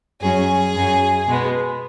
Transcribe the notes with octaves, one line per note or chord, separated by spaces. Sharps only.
F#2 F#3 C#4 G#4 G#5
F#2 F#3 C#4
B2 G#3 B3